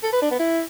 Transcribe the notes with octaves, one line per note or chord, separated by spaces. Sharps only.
A4
B4
D4
B3
E4